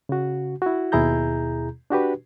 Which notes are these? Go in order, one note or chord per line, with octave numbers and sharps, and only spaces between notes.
C#3 F#4
E4 F#4
D#2 B2 E4 G#4 A#5 G6
D4 F#4 G4 B4